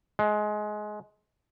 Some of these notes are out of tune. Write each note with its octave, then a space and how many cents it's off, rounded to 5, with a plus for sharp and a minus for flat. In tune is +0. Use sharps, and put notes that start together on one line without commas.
G#3 +20